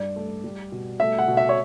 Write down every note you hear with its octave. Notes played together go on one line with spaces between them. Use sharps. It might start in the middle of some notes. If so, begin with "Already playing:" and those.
Already playing: G2 D5
A3
G3
B2
A3 E5
F#5
B2
E5
C#5